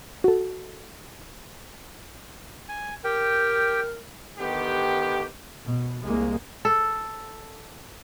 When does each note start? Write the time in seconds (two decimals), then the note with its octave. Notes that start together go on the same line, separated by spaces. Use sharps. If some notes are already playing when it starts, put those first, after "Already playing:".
0.24 F#4 A4
2.69 G#5
3.04 G4 A#4 G5
4.38 D3 D#3 B3 G4
5.66 B2
6.05 C2 G#3 A#3
6.65 A4